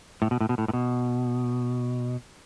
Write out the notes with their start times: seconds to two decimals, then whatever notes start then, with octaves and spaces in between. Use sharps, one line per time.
0.22 A2
0.31 B2
0.41 A2
0.49 B2
0.58 A2
0.68 A2
0.73 B2